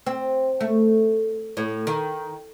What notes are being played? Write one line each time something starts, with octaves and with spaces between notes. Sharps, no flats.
C4
A3
A2
D#3